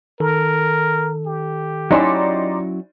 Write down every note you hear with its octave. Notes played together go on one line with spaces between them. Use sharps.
D#3 A4 A#4
G4
F#3 C#4 D#4 E4 D5 C6